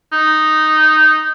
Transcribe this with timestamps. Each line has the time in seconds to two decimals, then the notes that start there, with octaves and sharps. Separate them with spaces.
0.12 D#4